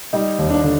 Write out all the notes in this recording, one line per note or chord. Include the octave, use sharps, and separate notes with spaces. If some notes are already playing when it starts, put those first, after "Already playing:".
G3 D#4
D#2
D4
D3